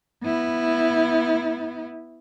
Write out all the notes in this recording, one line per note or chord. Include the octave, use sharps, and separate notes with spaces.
B3 E4